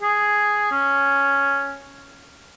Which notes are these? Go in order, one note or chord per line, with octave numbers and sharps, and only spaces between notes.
G#4
C#4